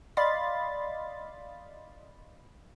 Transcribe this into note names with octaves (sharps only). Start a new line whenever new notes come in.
D5 D#5 F5 B5 C6 A6